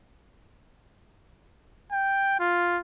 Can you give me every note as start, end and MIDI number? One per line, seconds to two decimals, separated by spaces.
1.92 2.39 79
2.40 2.80 65